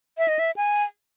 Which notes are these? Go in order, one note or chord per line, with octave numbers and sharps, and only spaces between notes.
E5
D#5
E5
G#5